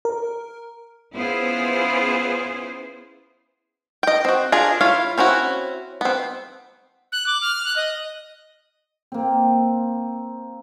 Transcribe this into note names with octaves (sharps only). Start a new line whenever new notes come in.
A#4
B3 C#4 E4 F4 G#4 C5
D#5 G5
C4 F#4
D4 F4 G#4 A#4
E4 F4 C#5 F5
C4 C#4 E4 F#4
B3 C4
F#6
D6
F6
F#6
D#5
A#3 C4